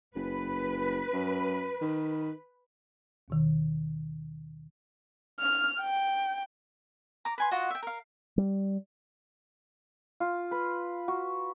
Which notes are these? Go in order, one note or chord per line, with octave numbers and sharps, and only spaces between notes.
F#1 B4
F#2
D#3
D#2 B2 D#3
F6
G5
A#5 D6
B4 G#5 C6
F4 F#4 D#5 F#5
E5 G5
A#4 F5
G3
F4
B4
F#4